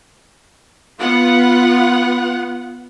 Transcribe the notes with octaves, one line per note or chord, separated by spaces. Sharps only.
B3 F4 F#5